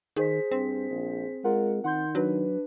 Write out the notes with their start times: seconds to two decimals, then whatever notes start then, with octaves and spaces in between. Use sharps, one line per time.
0.17 D#3 G#4 C5 B6
0.51 G2 C4
0.90 A#1
1.44 G#3 F4 A#4 F#5
1.84 D#3 F#5 C6 G6
2.15 F#3 D4 B4